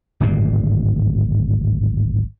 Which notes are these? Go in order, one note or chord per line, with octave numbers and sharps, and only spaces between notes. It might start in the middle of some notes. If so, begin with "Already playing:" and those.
D1 G#1 G2 A#2